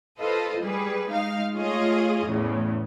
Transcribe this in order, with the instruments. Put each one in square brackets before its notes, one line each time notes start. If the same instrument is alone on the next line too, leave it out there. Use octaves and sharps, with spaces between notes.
[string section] F4 A4 B4 C5 D#5
G3 G#4 B4
G#3 D#4 F5
A3 F4 G#4 C#5 D#5
E2 A2 C#3